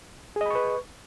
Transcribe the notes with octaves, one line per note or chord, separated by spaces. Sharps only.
G#4 B4 D#5 B5 C#6